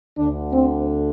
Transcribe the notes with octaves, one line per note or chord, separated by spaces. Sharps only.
D2 D3 D4
C4